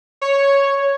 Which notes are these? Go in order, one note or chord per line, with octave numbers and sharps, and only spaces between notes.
C#5